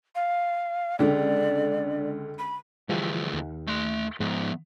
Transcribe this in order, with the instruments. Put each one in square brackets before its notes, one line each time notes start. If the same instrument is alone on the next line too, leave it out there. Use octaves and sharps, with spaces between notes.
[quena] F5
[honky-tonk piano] C#2 D3 [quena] D5
[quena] B5
[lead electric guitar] D2 G#4 [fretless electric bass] E3 F3 G3
[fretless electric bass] D#2
[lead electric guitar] A3 C6
[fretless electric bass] G#2 [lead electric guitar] F3 B3